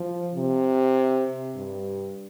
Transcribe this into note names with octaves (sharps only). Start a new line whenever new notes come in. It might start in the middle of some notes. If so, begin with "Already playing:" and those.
Already playing: F3
C3
G2